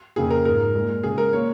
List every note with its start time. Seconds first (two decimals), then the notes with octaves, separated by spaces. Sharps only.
0.16 F2 C#3 F3 A#3 G#4
0.31 A#4
0.45 G#2 F3 G#3 A#4
0.74 A#2 G#3
1.03 C#3 G#3 G#4
1.18 A#4
1.33 A#2 A#3 C#5